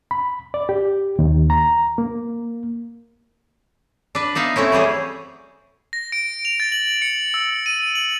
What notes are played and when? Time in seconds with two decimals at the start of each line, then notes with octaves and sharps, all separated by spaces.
0.11 B5
0.54 D5
0.69 G4
1.19 D#2
1.50 A#5
1.98 A#3
4.15 D4 B4
4.35 B3 D#4 E5 F5
4.56 A3 C4 C#4 E4
4.72 E3 F#3 G3 G#4
5.93 A#6
6.12 D7
6.45 F7
6.60 A6
6.72 F#7
7.02 C#7
7.34 E6
7.66 D#7
7.95 F#7